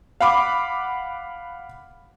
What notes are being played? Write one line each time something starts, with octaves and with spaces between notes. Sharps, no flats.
F5 F#5 B5 D6